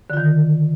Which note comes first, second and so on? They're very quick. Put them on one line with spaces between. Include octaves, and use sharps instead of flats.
D3 F4 D#3